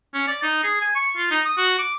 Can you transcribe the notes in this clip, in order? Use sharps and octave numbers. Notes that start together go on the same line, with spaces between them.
C#4
D5
D#4
G#4
G#5
C#6
F4
D#4
D#6
F#4
D6